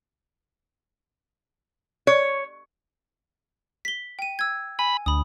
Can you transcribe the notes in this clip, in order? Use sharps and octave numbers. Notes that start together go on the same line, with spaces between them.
C#5
B6 G7
G5 D#7
E6 G#6
G#5 B5
D2 B5 D#6